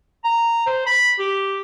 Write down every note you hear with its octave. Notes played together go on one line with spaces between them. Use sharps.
A#5
C5
B5
G4